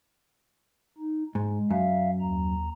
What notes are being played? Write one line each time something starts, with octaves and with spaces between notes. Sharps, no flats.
D#4
G#2 G#3
F#2 E5 F5
D#2 A#5